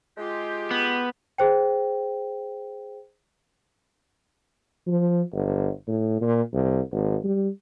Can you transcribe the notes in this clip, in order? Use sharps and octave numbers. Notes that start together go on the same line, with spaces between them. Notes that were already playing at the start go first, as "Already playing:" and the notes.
G#3 F4 G4
B3
G#4 C5 G5
F3
G1
A2
A#2
C2
G#1
G3